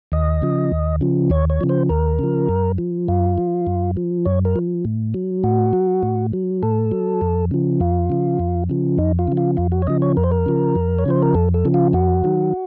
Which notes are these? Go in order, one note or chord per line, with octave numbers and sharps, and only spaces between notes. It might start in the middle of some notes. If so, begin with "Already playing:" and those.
D#2 D#5
C#3 F3
D#2
C#3 F3
D#2 C#5
C#5
C#3 F3
C5
D#2 A#4
C#3 F3
F#2
F3
F#2 F4
F3
F#2
F3
F#2 C#5
A#4
F3
A2
F#3
A2 F#4
F#3
A2
F#3
A2 A4
F#3
F2
C#3 F3
F2 F4
C#3 F3
F2
C#3 F3
F2 D#4
F4
C#3 F3
F4
F2 F4
F#4
C#5
C#3 F3 D#5
C#5
F2 A#4
C5
A#4
C#3 F3
F2
C#5
C#3 F3 C5
A#4
F2 A4
A4
C#3 F3
F4
F2 F#4
D#3 F#3